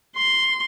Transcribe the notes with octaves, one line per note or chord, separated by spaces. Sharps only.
C6